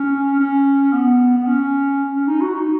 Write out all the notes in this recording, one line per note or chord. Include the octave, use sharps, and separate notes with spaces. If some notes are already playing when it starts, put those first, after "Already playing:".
Already playing: C#4
C#4
B3
B3
C#4
C#4
D#4
F#4
D#4